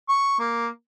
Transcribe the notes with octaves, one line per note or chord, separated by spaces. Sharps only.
C#6
A#3